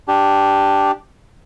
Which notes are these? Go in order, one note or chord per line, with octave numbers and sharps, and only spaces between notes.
D4 G4